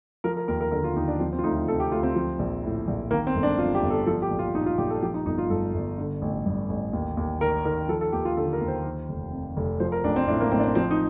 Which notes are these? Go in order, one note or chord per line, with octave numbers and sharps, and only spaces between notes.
F3 A#4
A#4
D#2 A#4
A#4
D3 A#4
F4
D#2 D#4
D4
F3 C4
C4
F4
D2 D#4
F4
C3 A4
G4
D2 F4
C4
F3
A#1
A2
A#1
D#3 A#3
C4
G1
D4
F2 F4
G4
G1
A4
F3 A4
G4
A#1
F4
A#2 D#4
F4
A#1 G4
A4
F3 G4
D#4
G1 D#4
F4
G2 A4
G1
D3
A1
G2
A1
D#2
D#2
D#3 A#4
D#3 A#4
F3 A4
A4
D#2 G4
F4
D3 A4
A#4
D#2
C5
D#3
F1
F2
F1
F3 C5
A#4
A1 D4
C4
A2 D4
A#3
A1 C4
D4
C4
F3 C4
D#4